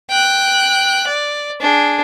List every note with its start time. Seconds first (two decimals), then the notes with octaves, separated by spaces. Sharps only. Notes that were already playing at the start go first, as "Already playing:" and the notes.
0.10 G5 F#6
1.07 D5
1.60 D4 G#4